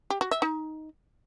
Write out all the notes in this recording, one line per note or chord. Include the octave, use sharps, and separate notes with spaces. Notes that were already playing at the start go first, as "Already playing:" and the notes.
G4
F#4
E5
D#4